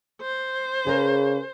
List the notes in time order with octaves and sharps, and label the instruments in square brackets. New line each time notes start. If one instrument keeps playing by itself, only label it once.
[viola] C5
[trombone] C#3 [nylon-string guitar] G#4 A#4 B4